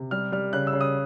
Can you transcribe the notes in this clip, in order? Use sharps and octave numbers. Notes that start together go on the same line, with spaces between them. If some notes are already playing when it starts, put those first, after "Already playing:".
Already playing: C3
G3 F6
G3 F6
C#3 F#6
E6
C#3
D#6